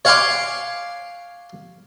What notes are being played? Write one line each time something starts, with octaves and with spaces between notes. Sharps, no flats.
C#5 F5 F#5 G#5 C6 D6